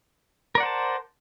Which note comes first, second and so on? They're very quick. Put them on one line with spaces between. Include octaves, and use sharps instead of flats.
A#4 D5 F#5 C5 A5